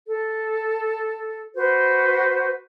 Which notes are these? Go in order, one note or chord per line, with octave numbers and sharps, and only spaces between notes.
A4
F#4 B4 C5